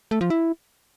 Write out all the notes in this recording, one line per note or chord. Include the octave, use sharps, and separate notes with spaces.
A3
F3
E4